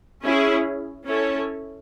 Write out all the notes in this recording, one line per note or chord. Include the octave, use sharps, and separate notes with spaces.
C#4 E4 G#4
C#4 E4 A4 C#5